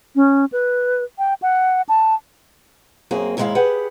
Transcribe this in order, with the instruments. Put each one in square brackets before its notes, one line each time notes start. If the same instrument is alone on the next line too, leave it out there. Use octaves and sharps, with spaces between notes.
[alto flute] C#4
B4
G5
F#5
A5
[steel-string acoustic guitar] F#2 A#3 C4 G#4
D#2 G#2 D#3 G#3 E4 F5
G4 G#4 B4 F#5